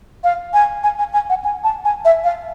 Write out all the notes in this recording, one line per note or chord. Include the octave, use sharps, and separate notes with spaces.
F5
G#5
G#5
G#5
G#5
F#5
G#5
A5
G#5
E5
F5